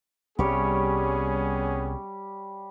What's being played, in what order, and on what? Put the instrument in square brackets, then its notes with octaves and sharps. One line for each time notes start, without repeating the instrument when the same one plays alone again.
[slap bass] C2 [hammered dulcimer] G3 G4 C#5 [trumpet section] B3 C#4 G#4